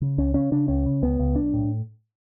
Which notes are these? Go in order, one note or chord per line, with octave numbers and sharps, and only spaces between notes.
C#3
C#2 C#4
C#3 C#4
C#3 D4
C#2 C#4
C#3
C#2 B3
C#2
B1 D4
A2